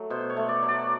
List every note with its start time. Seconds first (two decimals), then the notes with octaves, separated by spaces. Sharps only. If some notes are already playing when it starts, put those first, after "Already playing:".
Already playing: F#3 A3
0.10 B2 C5
0.30 C#5
0.37 A3
0.49 D5
0.62 F#3
0.68 D5